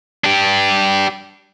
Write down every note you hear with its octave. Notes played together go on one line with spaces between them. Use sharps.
D4 G4